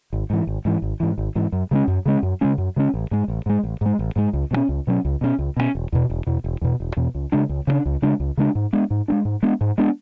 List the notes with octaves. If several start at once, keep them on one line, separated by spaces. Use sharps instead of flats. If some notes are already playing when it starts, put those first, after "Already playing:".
G#1
G#2 E3
G#1
G#2 E3
G#1
G#2 E3
G#1
G#2 E3
F#2
C#3 G#3 C#4
F#2
C#3 G#3 C#4
F#2
C#3 G#3 C#4
F#2
C#3 G#3 C#4
A1
G#2 G#3
A1
G#2 G#3
A1
G#2 G#3
A1
G#2 G#3
C#2
B2 F#3
C#4
C#2
B2 F#3 C#4
C#2
B2 F#3 C#4
C#2
B2 F#3 C#4
E1
E2 B2
E1
E2 B2
E1
E2 B2
E1
E2 B2
C#2
C#3 G#3 D4
C#2
C#3 G#3 D4
C#2
C#3 G#3 D4
C#2
C#3 G#3 D4
G#2
G#3 B3 D4
G#2
G#3 B3 D4
G#2
G#3 B3 D4
G#2
G#3 B3 D4